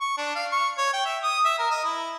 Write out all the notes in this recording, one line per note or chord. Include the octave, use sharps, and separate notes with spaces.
C#6
D4
F5
C#6
C#5
G5
E5
D#6
E5
A#4
D#5
E4